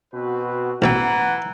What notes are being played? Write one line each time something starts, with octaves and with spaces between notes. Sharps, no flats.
B2 C4 F#4 B4
A1 B2 E3 F#5 G5 A#5